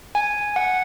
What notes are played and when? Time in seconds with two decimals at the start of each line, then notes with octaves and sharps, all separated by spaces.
0.15 G#5
0.56 F#5